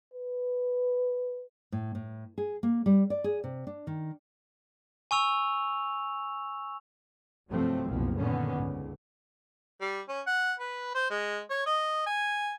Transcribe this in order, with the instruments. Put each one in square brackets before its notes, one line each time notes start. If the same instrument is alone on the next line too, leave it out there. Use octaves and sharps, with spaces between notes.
[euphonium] B4
[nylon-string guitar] A2
A2
G#4
A#3
G3
D5
G#4
C3
D4
D#3
[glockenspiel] G#5 C#6 E6 F7
[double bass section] G2 C3 F3 F#3 A3 C4
F#1 C2 B2 F3 A#3
A#2 D3 D#3 B3 C#4
C#2 G#2
[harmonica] G3
C#4
F#5
B4
C5
G#3
C#5
D#5
G#5